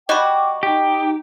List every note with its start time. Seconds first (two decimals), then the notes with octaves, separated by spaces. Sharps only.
0.09 G3 F#4 D#5 G5 B5 D6
0.63 D#4 G4